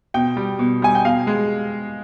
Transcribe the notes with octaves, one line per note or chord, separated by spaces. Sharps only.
B2 G5
G3
B2
G3 G#5
G5
B2 F5
G#3